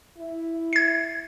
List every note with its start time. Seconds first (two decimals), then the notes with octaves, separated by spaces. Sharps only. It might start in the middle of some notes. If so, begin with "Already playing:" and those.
0.18 E4
0.73 G#6 C7